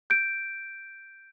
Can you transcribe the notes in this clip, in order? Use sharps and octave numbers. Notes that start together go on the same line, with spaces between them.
G6 D7